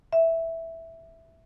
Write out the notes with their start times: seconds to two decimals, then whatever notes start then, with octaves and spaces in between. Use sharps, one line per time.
0.13 E5